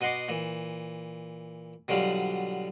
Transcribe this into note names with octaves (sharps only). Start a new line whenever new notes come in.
B2 D#5 F#5 C6 D6
A#2 E3
B2 D3 F#3 G3 F4